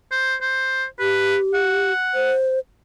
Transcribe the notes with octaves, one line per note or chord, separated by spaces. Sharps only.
C5
C5
G4 B4
F#5
C5